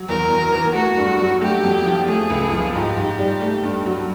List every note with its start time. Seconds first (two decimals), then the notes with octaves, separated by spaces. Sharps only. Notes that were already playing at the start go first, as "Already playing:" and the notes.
Already playing: F#3
0.08 E2 A#4
0.30 E2
0.53 E3
0.74 A3 F#4
0.97 G2
1.19 F#3
1.41 A3 G4
1.64 F2
1.86 F3
2.08 A3 G#4
2.30 C#2
2.52 F3
2.74 G#2 G4
2.97 G#2
3.19 G3
3.42 A3
3.63 G2
3.86 F#3